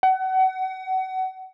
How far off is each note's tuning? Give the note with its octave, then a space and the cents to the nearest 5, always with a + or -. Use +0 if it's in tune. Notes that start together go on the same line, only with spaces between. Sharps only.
F#5 +30